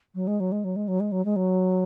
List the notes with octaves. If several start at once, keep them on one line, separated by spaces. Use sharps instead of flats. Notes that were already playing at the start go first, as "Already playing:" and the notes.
F#3
G#3
F#3
G#3
F#3
G#3
F#3
G#3
F#3
G#3
F#3